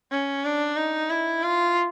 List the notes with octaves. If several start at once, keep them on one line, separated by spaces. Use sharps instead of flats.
C#4
D4
D#4
E4
F4